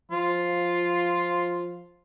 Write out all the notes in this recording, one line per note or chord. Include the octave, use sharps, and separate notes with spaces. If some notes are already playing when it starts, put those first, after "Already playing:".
F3 F4